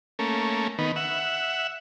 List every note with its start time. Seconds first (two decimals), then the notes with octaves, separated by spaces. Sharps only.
0.19 A3 A#3 C#4
0.78 D#3 B3
0.96 E5 F#5